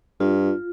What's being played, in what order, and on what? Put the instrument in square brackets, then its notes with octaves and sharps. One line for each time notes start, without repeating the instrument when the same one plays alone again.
[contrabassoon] G2 [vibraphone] F4